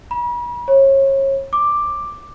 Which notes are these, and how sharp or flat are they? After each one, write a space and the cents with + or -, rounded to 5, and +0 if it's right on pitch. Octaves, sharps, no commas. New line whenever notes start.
B5 -40
C#5 -30
D6 +5